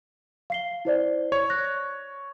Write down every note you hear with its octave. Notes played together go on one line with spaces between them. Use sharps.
F5 C7 G7
E4 C5 D5
C#5
F#6 A#6